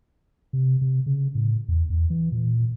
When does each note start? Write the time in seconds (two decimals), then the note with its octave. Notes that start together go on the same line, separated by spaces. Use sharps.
0.53 C3
0.81 C3
1.06 C#3
1.35 A2
1.68 E2
1.90 E2
2.10 E3
2.32 A#2